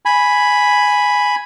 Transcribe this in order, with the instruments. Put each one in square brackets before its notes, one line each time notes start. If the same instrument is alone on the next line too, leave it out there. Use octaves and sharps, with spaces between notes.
[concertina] G#5 B5